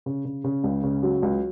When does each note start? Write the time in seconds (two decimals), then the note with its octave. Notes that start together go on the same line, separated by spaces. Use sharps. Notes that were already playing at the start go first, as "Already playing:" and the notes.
0.06 C#3
0.25 C#3
0.44 C#3
0.64 C#2
0.84 C#3
1.03 F#3
1.23 C#2